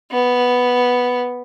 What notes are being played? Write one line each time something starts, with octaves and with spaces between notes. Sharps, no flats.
B3